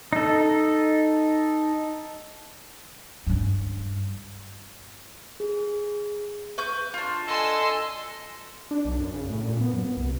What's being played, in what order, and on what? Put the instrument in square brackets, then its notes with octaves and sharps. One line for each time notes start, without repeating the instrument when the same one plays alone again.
[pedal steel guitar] D#4 A4
[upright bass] G2 C#4
[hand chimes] G#4
[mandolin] B4 C#6 G6
D4 F4
[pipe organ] A4 D#5 A5 [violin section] G#5 C6 E6
[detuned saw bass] D4
B1
F#2
C#3
A2
A#2
B3
F#2
B3
C2